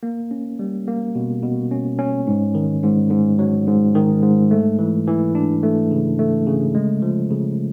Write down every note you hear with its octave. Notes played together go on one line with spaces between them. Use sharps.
A#3
C#4
G3
A#3
B2
B2
C#4
C#4
G#2
D#3
G#2
G#2
F#3
G#2
D#3
G#2
A3
E3
E3
D4
A3
C#3
A3
C#3
G#3
F3
C#3